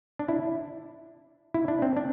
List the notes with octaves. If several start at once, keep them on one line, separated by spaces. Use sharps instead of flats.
D4
E4
E4
D4
C4
D4